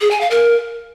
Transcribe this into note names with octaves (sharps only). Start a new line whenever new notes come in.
G#4
G#5
F5
A#4